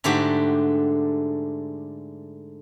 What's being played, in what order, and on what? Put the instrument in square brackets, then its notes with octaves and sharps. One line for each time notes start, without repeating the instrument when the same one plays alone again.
[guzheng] G#2 D3 A3 D4 F#4 G4